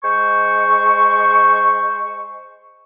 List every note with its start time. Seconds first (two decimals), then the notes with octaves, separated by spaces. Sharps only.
0.02 G#3 C5 C#6